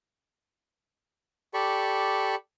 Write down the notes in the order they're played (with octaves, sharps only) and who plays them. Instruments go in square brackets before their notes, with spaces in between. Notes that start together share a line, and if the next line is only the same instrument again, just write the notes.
[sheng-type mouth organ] G4 A4 D5 B5 C#6